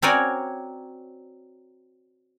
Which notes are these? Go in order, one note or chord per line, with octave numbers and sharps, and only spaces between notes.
C4 F#4 A#4 C#5 D5 G#5